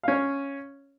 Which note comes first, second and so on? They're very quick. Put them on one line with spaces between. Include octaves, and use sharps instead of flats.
F5 C#4 C#5